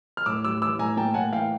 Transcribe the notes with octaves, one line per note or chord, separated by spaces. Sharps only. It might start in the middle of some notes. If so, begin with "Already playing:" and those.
F6
A2 D6 E6
G3 D6 E6
E3 D6 E6
A2 G#5 A#5
A#3 G5 A5
A2 F#5 G#5
E3 F5 G5